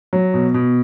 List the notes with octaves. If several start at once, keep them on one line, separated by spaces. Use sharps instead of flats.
F#3
B2
B2